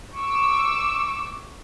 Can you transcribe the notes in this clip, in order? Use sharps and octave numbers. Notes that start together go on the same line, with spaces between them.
C#6 D6 E6